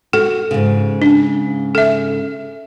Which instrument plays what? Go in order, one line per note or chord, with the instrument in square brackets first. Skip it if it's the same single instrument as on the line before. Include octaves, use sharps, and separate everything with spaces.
[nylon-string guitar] F#4 [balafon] A4
[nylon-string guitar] G#2 C#3
[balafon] D4
A4 E5